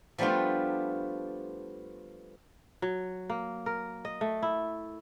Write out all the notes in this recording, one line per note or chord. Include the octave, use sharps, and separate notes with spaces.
F3 G3 A3 B3 D4 F4
F#3
A#3
A#4
D#5
A3
E4